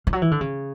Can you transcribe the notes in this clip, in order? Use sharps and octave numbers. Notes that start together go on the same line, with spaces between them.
F3
F#3
E3
D3
C#3